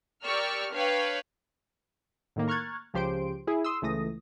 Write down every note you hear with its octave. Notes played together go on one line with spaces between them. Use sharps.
G4 A#4 D5 C#6 E6 F6
D4 B4 C#5 F5 G5
A2 D#3 A#3
A#5 C#6 F6 F#6 G#6 A6
C#2 F3 G4 C5 C6 D7
E4 G#4
C6 D#6 E6
C#2 E3 A3 D#6 A#6